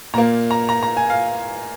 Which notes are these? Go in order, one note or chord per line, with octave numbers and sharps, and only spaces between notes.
A#2 A#3 A#5
A#5
A#5
A#5
G#5
F5